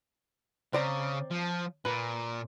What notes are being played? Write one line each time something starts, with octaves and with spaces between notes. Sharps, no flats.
C#3 C4 D5 A#5
F3
A#2 B4